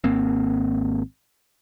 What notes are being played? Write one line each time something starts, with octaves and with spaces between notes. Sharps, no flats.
G#1 A#3 C4